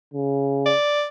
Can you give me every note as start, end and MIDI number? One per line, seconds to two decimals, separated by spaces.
0.14 0.73 49
0.66 1.05 74